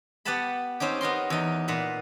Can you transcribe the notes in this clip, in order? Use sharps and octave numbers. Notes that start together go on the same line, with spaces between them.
B3 G4 B4 F#5 A5 B5
C4 C#4 D#4 G4
B3 D#4 A#4 C6
E2 D#4
A#2 B4 F#5